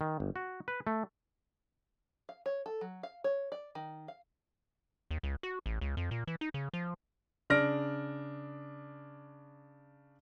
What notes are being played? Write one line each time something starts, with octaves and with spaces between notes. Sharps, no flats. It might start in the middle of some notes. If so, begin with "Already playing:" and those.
D#3
G1
F#4
B4
A3
F5
C#5
A4
F#3
F5
C#5
D5
D#3
F5
D#2
C#2
F#4
A1
C#2
F2
A#2
E3
D#4
C#3
F3
C#3 D4 F6 A#6 D7